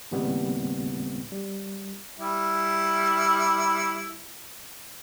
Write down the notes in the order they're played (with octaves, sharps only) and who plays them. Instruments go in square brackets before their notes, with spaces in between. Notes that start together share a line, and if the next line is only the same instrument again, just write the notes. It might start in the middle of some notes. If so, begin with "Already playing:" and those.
[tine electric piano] D#2 A2 C#3 G3 B3 C4
G3
[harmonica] G3 E4